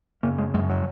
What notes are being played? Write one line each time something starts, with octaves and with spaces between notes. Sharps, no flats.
F#2 C#3 A#3
G#3
F#2 C#3 G#3
F#3